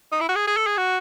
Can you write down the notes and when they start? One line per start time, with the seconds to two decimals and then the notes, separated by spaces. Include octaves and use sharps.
0.12 D#4
0.21 E4
0.29 F#4
0.36 G#4
0.47 G#4
0.57 A4
0.67 G#4
0.78 F#4